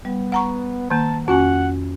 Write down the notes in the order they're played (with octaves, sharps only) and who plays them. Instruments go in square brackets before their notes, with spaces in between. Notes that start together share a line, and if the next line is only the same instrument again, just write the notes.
[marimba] G3 [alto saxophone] B3
[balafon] F#5 A#5 C#6
[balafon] D#3 A#3 [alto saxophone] A5 [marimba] A#5
[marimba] F2 C#4 G#5 [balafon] F#4 [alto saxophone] F#5